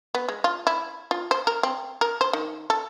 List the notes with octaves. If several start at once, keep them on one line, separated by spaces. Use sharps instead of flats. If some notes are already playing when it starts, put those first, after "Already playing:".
B3
G#3
F4
E4
F4
C5
A#4
C4
A#4
C5
D#3
A4